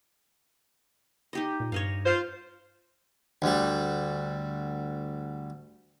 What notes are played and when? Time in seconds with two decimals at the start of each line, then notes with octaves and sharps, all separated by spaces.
1.33 D#4 G4 D#5
1.60 A#2
1.72 G2 C#5 D#5 F5
2.04 F4 C5
3.42 D2 G3